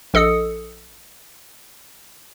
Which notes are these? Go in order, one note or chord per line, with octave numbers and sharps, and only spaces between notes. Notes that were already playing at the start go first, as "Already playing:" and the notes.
A#1 A4 D#5 D#6 E6 C#7